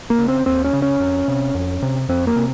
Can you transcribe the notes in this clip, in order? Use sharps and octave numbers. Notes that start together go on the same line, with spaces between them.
A#3
C#3
C4
D#2 C4
C#4
C#3
C#4
F2
C3
F2
C3
F2 C4
A#3
C3